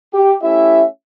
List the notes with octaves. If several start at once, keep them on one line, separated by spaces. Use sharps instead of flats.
G4
A3 C#4 E4 G4 E5